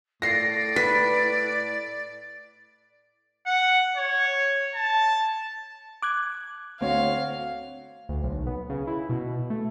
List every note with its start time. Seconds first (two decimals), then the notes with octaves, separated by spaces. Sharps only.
0.22 A2 D5 A#6 C7
0.76 B4 B6
3.46 F#5
3.96 C#5
4.75 A5
6.02 D6 F#6 G#6
6.81 D2 C4 F#4 C#5 F5
8.09 D2
8.23 B1
8.47 B3
8.70 C#3
8.87 E4
9.09 B2
9.50 A3